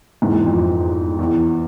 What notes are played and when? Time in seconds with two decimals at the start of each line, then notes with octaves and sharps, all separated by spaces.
0.22 E2 G#2
0.46 F2
1.19 E2